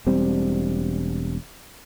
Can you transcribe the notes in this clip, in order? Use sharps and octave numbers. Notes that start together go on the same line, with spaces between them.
E1 G3 C4